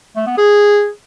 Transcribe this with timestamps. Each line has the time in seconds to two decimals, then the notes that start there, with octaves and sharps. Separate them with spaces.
0.16 A3
0.27 B3
0.38 G#4